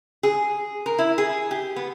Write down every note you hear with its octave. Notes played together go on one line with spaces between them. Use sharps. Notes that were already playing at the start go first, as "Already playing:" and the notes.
G#4
A#4
E4
G#4
G4
B3